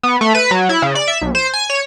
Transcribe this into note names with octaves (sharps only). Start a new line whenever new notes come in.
B3
A3
B4
F#3
E4
C#3
D5
E5
B1
C5
G#5
C#5